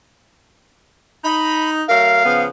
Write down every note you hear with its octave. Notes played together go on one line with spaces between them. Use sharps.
D#4 B5
F#3 A3 A#4 F5
C#3 F3 B3